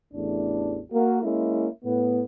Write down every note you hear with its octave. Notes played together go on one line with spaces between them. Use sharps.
A1 E2 A3 D4
A#3 F#4
G#3 A#3 C#4 E4
A2 B3